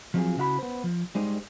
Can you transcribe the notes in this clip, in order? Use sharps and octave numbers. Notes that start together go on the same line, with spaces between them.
F3 F#3 C4 F4 G#4
C#3 E4 F#4 F5 A5 B5
B3 C5
F3
G3 G#3 D#4 C5